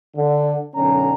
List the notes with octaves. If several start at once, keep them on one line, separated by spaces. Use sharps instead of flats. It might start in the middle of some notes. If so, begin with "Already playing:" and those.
D3
B1 F#2 D3 C#4 A#5